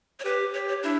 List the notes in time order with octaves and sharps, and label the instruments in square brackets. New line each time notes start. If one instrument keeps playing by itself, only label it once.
[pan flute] C#5
[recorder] G4 [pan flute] B4
[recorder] G4 [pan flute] C#5
[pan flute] C#5
[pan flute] D4 [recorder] E4